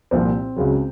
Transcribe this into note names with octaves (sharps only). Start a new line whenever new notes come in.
C2 A#2 F3 C4
C#2 C#3 F#3